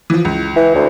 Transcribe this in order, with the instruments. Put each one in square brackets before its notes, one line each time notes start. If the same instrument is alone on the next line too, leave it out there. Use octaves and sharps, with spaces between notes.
[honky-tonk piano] E3 F3
C#2
[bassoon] E3
D2